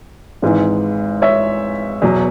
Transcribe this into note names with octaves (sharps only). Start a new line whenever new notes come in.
G#1 G#2 E3
C#5 E5
E2 B2 F#3